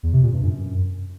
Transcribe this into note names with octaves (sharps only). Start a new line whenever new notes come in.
E2
C3
A#2
G2
F#2